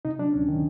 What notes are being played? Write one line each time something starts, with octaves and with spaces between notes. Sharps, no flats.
C3 D#4
F#3 D4
D2 C#4
D#3